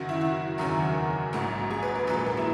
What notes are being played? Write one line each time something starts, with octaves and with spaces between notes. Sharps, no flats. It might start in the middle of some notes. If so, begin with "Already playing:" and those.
Already playing: F#1 F#2 D#3 F#3 F#4
E4
F#4
F#1 E2 D#3 F#3 A#4
A#1 G#2 F#3
G#4
B4
A#4
A#1 A#2 F#3 B4
B4
A#4
E4